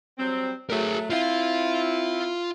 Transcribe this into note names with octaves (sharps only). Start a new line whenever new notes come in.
F#3 G3 C4
F#3 A3 G#4 A#4
C4 E4 F4 F5